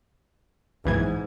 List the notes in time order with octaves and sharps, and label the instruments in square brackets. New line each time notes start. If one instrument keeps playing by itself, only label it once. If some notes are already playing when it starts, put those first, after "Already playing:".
[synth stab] B1 E3 G#6 [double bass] G#2